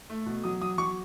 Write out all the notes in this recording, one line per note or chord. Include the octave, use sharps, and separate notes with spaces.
A3
B2
F#3 D#6
F#3 D#6
F#3 C#6